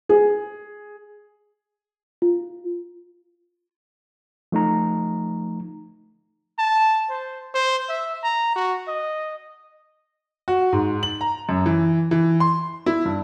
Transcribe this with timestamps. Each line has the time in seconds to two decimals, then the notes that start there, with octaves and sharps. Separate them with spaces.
0.09 G#4
2.22 F4
4.52 F3 A3 D#4 A#5
6.59 A5
7.10 C5
7.54 C5
7.89 E5
8.24 A#5
8.56 F#4
8.88 D#5
10.48 F#4
10.72 G#2
11.03 F#7
11.21 A#5
11.49 F#2
11.66 E3
12.11 E3
12.40 C6
12.86 E4
13.05 G2